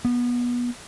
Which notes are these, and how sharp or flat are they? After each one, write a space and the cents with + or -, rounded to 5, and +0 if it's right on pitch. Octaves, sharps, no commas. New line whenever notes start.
B3 -25